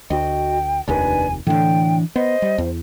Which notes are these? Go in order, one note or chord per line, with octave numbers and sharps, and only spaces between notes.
D2 F#4 D#5 G5
F1 D#2 D#3 D4 B4 G#5
A2 D3 E3 D4 G5
B3 C5 D#5
G3
E2